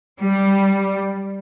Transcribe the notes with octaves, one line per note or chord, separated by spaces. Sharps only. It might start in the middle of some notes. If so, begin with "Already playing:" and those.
G3